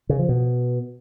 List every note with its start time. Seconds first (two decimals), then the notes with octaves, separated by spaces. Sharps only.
0.09 C#3
0.19 F3
0.29 B2